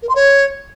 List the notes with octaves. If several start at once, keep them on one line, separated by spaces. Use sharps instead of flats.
A#4
C6
C#5